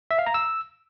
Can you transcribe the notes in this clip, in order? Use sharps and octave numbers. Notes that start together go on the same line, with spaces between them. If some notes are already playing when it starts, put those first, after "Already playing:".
E5
F5
A#5
E6